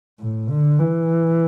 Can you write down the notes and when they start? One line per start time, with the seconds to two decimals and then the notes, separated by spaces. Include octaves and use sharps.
0.20 A2
0.49 D3
0.79 E3